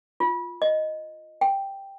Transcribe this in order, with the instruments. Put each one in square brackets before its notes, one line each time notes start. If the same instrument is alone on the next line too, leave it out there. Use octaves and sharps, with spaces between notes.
[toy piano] F4
D#5
G5